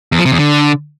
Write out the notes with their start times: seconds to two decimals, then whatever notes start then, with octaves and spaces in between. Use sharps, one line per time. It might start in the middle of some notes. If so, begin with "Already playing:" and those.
0.12 E2
0.19 F3
0.25 C3
0.32 E2
0.39 D3